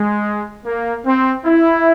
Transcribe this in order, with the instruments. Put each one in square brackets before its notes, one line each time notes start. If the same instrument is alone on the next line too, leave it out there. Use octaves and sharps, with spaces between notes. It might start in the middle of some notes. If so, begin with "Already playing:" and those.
Already playing: [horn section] G#3
A#3
C4
E4